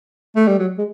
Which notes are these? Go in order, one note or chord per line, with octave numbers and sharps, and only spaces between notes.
A3
G3
F#3
G#3